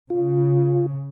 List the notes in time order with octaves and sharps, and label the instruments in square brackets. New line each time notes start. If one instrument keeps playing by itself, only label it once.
[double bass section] C#3 [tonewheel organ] F4